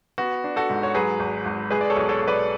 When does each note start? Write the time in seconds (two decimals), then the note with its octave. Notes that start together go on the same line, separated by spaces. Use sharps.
0.18 B3 F#4
0.44 D4
0.56 F#4 A4
0.70 G#2
0.83 C#5
0.95 F#3 G#4 B4
1.19 G#1
1.45 G#1
1.70 G#3 G#4 B4
1.81 D5
1.90 A4 C#5
1.96 B1
2.09 A4 C#5
2.22 B1
2.28 B4 D5